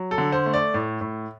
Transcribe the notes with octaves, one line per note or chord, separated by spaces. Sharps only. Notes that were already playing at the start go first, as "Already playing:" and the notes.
Already playing: F#3
A4
D3
C5
A3
D5
A2
A2